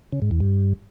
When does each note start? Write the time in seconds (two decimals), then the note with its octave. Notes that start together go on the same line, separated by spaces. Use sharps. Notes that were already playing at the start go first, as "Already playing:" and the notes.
0.12 C#3
0.22 G#2
0.31 E2
0.40 G2